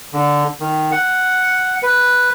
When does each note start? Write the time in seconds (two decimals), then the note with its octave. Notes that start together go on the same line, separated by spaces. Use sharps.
0.13 D3
0.60 D#3
0.92 F#5
1.83 B4